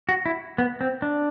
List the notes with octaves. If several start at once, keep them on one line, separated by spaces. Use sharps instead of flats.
F#4
E4
B3
C4
D4